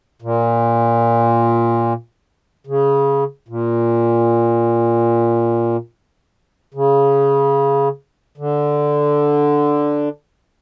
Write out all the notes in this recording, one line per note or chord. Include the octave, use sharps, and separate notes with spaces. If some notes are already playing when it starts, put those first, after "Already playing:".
A#2
C#3
A#2
C#3
D3